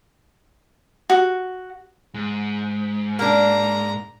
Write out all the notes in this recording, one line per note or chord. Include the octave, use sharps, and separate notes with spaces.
F#4
G#2
A#3 D4 A#5